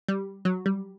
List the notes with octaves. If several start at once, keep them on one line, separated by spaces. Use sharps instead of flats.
G3
F#3
G3